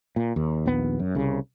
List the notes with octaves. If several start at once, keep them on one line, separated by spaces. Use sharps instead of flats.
A#2
D#2
A#1 D#2 B3
F#2
C2 C#3